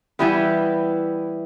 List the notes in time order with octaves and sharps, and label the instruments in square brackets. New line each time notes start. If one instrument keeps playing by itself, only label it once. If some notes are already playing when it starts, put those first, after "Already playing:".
[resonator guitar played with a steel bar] E3 G3 B3 E4